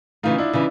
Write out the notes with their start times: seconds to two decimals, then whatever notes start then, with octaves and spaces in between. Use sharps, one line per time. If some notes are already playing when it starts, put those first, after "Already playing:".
0.23 C#3 E3 A3 D#4 F4
0.38 D4 E4
0.53 C#3 E3